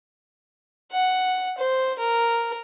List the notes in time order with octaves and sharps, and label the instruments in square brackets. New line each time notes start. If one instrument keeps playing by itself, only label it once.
[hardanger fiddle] F#5
C5
A#4